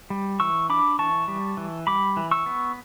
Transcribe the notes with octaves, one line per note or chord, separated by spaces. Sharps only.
G3
E3 C#6 E6
D4 B5 D6
E3 A5 C#6
G3
E3
G3 B5 D6
E3
C#6 E6
B3